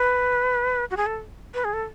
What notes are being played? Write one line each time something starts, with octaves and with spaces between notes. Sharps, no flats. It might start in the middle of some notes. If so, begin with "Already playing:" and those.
Already playing: B4
F#4
G#4
A4
B4
G#4
A4